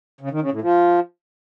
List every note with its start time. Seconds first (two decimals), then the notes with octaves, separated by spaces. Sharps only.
0.21 C#3
0.31 D#3
0.41 C#3
0.51 A2
0.62 F3